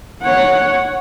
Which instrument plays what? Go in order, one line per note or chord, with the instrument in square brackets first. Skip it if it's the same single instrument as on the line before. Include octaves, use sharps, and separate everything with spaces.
[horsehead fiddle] C#5 F#5